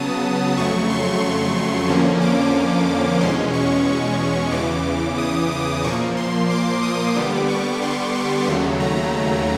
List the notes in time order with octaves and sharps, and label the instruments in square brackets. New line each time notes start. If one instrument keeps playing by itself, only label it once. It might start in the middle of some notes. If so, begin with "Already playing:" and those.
Already playing: [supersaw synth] C#3 F#3 B3 A5 D#6
F2 C#3 F#3 A3 C#6
C6
C#6
F2 D3 F3 A#3 C#4
D6
E2 B2 G#3 C#4 C6
C#6
E2 C#3 E3 D6
D#6
D6
A#2 F3 A#3 C#6
C6
D6
D#6
D3 G3 B3 D6
C#6
C6
C6
D#2 C#3 F#3 A3
A#5